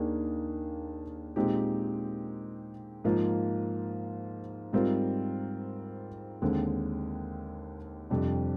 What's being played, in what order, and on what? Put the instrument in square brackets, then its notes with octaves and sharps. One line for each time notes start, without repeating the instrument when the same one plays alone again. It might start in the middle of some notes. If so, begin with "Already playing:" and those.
Already playing: [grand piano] D#2 D#3 A#3 D4 G#4
A#2 G#3 C4 D#4 G4
G#2 F3 A#3 F4
G#2 G3 C4 F4 A#4
D#2 D3 G#3 C4
F2 C3 G3 D4